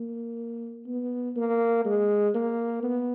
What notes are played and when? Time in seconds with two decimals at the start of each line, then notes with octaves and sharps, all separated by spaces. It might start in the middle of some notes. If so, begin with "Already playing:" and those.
Already playing: A#3
0.86 B3
1.36 A#3
1.85 G#3
2.34 A#3
2.83 B3